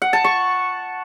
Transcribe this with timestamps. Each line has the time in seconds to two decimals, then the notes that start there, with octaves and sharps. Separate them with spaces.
0.02 F#5
0.13 A5
0.24 C#6